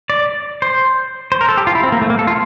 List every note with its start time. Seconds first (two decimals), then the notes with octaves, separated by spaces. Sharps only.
0.10 D5
0.62 C5
1.32 C5
1.41 A#4
1.49 A4
1.57 G4
1.67 F4
1.75 E4
1.84 C4
1.92 A#3
2.02 A3
2.10 A#3
2.19 A4
2.27 F4